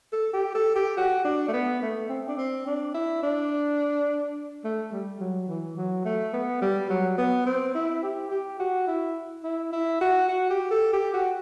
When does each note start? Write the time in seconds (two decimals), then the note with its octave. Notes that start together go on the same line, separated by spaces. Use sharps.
0.13 A4
0.33 G4
0.55 A4
0.76 G4
0.97 F#4
1.25 D4
1.48 A3
1.53 B3
1.82 A3
2.09 C4
2.28 D4
2.37 C4
2.67 D4
2.94 E4
3.23 D4
4.64 A3
4.92 G3
5.20 F#3
5.48 E3
5.77 F#3
6.05 A3
6.33 B3
6.62 G3
6.89 F#3
7.18 B3
7.46 C4
7.75 E4
8.03 G4
8.31 G4
8.59 F#4
8.87 E4
9.44 E4
9.73 E4
10.01 F#4
10.28 F#4
10.50 G4
10.71 A4
10.93 G4
11.14 F#4